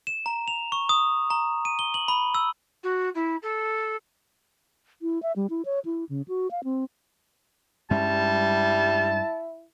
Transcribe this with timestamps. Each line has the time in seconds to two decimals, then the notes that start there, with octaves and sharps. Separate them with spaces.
0.07 E7
0.26 A#5
0.48 F7
0.72 C#6
0.89 D#6
1.30 A#5
1.65 D#7
1.79 G7
1.94 F#7
2.08 B5
2.35 E6
2.83 F#4
3.15 E4
3.42 A4
5.02 E4
5.23 E5
5.36 G3
5.50 E4
5.65 C#5
5.85 E4
6.09 C#3
6.28 F#4
6.51 F5
6.64 C4
7.91 G2 G3 G#3 C#4 E4 A5